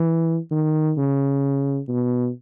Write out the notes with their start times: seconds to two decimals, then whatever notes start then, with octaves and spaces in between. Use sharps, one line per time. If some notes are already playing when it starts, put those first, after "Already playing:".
Already playing: E3
0.51 D#3
0.97 C#3
1.88 B2